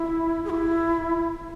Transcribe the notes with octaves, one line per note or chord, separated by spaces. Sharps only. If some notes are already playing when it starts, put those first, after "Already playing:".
Already playing: E4
G#4
E4